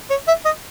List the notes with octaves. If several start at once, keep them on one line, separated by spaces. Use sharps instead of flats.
C#5
E5
D#5